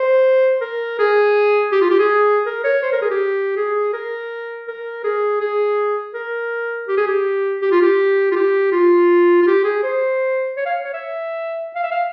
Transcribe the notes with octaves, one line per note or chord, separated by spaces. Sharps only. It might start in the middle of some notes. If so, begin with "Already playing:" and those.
Already playing: C5
A#4
G#4
G4
F4
G4
G#4
A#4
C#5
C5
A#4
G#4
G4
G#4
A#4
A#4
G#4
G#4
A#4
G4
G#4
G4
G4
F4
G4
F4
G4
F4
F4
G4
G#4
C5
C#5
F5
C#5
E5
F5
E5
F5